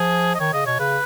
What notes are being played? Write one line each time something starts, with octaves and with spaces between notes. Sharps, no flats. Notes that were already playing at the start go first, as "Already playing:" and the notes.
Already playing: F3 G#4
D#5
D#3 C#5
C#3 D#5
B2 C#5
C#3 B4